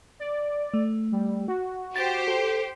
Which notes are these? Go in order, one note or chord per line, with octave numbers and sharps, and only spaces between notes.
D5
A3
G3
F#4
G4 C5 A6
A4